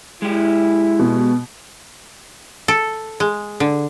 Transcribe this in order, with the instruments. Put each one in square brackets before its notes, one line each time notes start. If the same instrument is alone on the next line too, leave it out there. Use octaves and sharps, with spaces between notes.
[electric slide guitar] G#3 G4 [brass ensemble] E4
[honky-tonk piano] B2
[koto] A4
G#3
D3